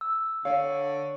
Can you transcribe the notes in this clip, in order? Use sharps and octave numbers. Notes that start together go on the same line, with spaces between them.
E6
D3 C#5 F5